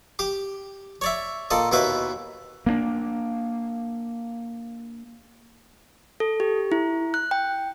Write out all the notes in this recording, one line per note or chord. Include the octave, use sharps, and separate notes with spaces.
G4 D6
C#5 D5 E5
A#2 A4 D5 D#5
D#2 B2 E4 B4 E5 D6
A#3 B3 D4
A4
G4
E4
F#6
G5